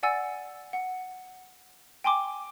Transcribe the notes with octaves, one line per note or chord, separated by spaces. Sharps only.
D5 F#5 G#5 E6 A6
F#5
G5 G#5 C6 D6